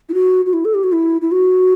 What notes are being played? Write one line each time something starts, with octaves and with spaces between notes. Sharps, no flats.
E4
F#4
F#4
E4
A4
G4
F#4
E4
E4
F#4